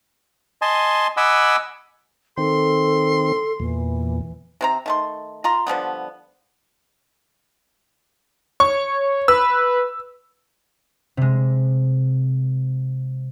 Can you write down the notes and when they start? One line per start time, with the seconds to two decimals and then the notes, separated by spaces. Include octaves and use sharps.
0.62 D#5 G#5 A5 C6
1.17 D#5 F#5 G#5 B5 D6 E6
2.38 D#3 C4 A4 C6
3.60 E2 A#2 E3
4.61 C3 C4 A#5
4.86 D#3 A3 C6
5.44 F4 A#5 C6
5.67 D3 F3 G3 B3
8.60 C#5 C#6
9.28 B4 E6
11.17 C3 G#3